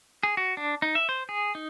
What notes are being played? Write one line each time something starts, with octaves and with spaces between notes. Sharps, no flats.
G#4
F#4
D4
D#4
E5
C5
G#4
D#4